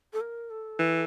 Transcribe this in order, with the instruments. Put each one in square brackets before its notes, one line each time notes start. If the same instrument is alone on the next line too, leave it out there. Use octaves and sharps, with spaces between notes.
[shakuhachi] A4
A#4
A4
[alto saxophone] E3